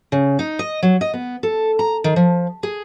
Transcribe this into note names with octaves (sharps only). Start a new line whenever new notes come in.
C#3
D#4
D#5
F#3
D#5
B3
A4
A#5
D#3
F3
G#4